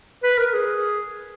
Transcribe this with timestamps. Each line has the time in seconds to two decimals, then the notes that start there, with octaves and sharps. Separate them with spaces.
0.23 B4
0.38 A#4
0.53 G#4